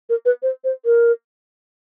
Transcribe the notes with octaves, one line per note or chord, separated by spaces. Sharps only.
A#4
B4
C5
C5
A#4